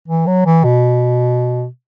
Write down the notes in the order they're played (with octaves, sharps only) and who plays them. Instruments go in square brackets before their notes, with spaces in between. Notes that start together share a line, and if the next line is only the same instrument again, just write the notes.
[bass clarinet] E3
F#3
E3
B2